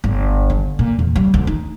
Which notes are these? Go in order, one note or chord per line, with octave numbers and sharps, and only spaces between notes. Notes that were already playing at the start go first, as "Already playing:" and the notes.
G1
D3
A#2
E2
G3
D2
D#4